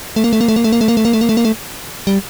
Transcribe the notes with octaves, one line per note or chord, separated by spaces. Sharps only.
A3
A#3
A3
A#3
A3
A#3
A3
A#3
A3
A#3
A3
A#3
A3
A#3
A3
A#3
A3
G3